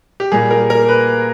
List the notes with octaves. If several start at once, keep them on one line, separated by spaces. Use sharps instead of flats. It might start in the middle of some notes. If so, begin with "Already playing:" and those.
G4
A#2 G3 A#3 G#4
A#4
A#4
B4